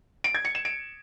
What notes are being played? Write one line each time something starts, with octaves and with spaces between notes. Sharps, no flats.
D7
G#6
C#7
E7
D7